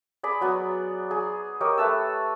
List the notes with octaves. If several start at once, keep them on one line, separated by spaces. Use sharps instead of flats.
G#4 D5 B5
F#3 B3
G#4
G4 A#4 C#5 D#5
A3 B4 A5 E6